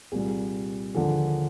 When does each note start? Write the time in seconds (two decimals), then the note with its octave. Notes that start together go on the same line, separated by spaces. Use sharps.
0.12 C2 A#2 G3 G#4
0.94 D#2 D3 F3 G#4